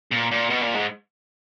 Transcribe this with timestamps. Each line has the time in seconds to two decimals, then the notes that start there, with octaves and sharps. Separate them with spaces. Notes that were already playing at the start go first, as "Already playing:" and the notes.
0.11 A#2
0.31 A#2
0.50 B2
0.61 A#2
0.74 G#2